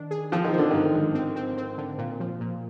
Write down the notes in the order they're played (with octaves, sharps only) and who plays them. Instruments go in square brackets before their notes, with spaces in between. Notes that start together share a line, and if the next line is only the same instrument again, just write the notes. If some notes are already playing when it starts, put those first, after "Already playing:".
Already playing: [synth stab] D#3 D4
G#4
[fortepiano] F3 [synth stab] C4
[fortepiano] D#3
[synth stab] F3
[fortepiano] D3
[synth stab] G2 [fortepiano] D#3
[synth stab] G#1
C4
C4
C4
D3
A#2
F3
A#2